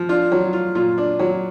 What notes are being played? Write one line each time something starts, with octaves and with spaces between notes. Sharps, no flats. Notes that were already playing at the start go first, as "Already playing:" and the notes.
Already playing: F3
D4 F4
F#3
F4
A#2 F4
D4
F#3